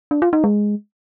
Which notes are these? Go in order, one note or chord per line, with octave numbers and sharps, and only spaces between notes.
D4
F4
D#4
G#3